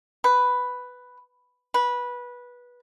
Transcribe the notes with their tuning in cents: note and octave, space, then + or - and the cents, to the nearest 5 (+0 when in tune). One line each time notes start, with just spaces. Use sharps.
B4 +5
B4 -15